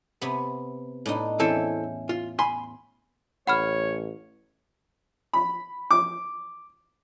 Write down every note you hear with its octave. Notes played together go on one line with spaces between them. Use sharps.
C3 B3
A2 D4 D#4
E2 C4 C#4 E4 A4
F4
G#5 B5 C6
A1 C#5 F#5 B5 F6
B5
D6